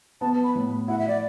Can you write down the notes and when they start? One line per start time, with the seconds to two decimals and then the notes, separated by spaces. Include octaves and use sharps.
0.21 B3 A5
0.44 B5
0.55 A2
0.88 E4 F#5
0.98 E5
1.08 D5